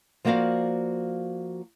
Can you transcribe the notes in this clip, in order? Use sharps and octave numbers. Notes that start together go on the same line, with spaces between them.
F3 A#3 F#4 C5 D5 F5